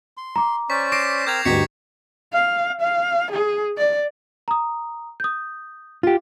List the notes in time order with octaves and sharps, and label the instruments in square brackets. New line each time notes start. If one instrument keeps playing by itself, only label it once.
[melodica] C6
[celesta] A#5 D6
[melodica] C#4 C5 D5 [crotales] C#6 B6
[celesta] D6 D7 [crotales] A#6 C7 E7
[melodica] C4 A#4 E6 [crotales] G6 G#6 F7
[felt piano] D2 G2 [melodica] D#4 G4 C#6 [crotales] G#6 B6 C#7
[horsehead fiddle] F5
F5
G#4
D5
[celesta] A#5 D#6
D#6 G6
[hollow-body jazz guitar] F4 G4